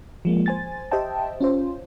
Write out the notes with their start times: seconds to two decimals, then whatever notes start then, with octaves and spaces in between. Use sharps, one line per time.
0.25 F3 G#3 A#3
0.46 C5 G#5 A6
0.91 G4 C5 D#5 E5 G5 A5
1.41 C#4 F4 C5